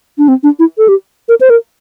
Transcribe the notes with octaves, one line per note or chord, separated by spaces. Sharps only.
D4
C4
D4
E4
A4
G4
A#4
C5
A#4